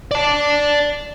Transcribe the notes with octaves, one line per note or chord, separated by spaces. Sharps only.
D5 A5